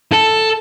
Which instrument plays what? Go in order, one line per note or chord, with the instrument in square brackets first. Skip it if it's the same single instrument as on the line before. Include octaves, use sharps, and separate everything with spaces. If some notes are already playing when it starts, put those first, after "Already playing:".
[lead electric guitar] A4